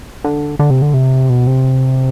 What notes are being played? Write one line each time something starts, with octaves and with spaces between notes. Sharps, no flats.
D3
D3
C3
D3
C3
B2
C3